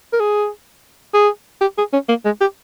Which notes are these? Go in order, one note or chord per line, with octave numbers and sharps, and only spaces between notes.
A#4
G#4
G#4
G4
G#4
C#4
A#3
G#3
G4